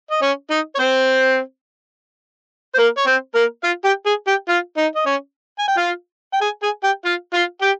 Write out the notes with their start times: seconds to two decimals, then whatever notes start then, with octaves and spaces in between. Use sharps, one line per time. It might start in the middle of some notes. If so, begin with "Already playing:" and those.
0.11 D#5
0.22 C#4 C#5
0.50 D#4 D#5
0.75 C#5
0.79 C4 C5
2.74 C5
2.78 A#3 A#4
2.97 C#5
3.06 C4 C5
3.35 A#3 A#4
3.64 F4 F5
3.85 G4 G5
4.06 G#4 G#5
4.27 G4 G5
4.49 F4 F5
4.77 D#4 D#5
4.96 D#5
5.06 C#4 C#5
5.59 G#5
5.68 G5
5.77 F4 F5
6.33 G5
6.41 G#4 G#5
6.63 G#4 G#5
6.84 G4 G5
7.05 F4 F5
7.34 F4 F5
7.62 G4 G5